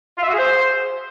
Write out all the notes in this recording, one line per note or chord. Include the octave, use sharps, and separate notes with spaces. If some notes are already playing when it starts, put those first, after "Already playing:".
F4
E5
F#4
G#4
C5